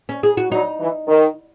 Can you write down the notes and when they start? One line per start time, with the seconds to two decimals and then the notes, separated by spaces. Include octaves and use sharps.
0.09 C#4
0.23 G#4
0.37 F#4
0.51 F#3 D#4
0.80 E3
1.08 D#3